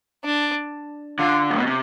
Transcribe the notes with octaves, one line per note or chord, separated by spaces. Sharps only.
D4
D3 F4
A2
B2
C3